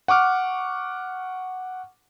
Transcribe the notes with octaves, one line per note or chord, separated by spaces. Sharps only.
F#5 C#6 D6 F6